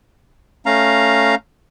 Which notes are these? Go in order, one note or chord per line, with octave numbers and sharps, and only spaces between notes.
A3 C#4 F5 A#5